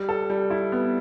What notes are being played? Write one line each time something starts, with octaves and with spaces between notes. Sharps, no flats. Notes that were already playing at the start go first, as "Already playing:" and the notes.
Already playing: G3
A4
G3
E4
B3